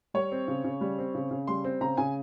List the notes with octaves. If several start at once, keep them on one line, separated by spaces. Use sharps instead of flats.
G3 C#5
C4
C#3
C#3
G3
C4
C#3
C#3
G3 C6
C4
C#3 A#5
C#3 G#5